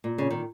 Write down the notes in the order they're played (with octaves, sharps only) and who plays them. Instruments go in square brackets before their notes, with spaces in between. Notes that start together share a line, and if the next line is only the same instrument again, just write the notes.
[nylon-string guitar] A#2
C#3
D#3